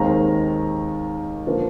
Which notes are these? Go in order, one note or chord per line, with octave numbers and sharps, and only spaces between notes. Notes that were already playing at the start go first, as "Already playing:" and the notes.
Already playing: D#2 D#3 G#3 C4 A#5
D3 F3 A#3